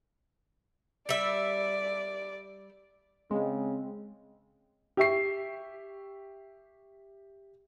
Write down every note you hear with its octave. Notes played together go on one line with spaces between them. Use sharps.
G3 D5 E5
C#3 G#3 C4
G4 E5 C#6 C7